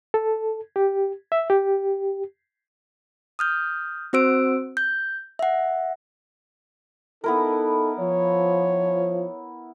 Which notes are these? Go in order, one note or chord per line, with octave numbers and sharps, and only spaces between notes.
A4
G4
E5
G4
D#6 F6 G6
C4 F#4 C5 E6 D7
G6
E5 F#5
B3 D#4 E4 A4 A#4
F3 C#5